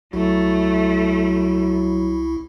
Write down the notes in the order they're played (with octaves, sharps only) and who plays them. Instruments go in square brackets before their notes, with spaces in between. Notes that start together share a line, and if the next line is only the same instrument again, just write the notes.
[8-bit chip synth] C2 E4 [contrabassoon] F#3 [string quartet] A3